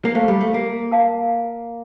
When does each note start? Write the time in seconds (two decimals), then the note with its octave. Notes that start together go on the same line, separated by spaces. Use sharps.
0.05 A#3
0.15 A3 C5 F5 A5
0.28 G3
0.41 A3
0.54 A#3
0.91 A#4 F5 A5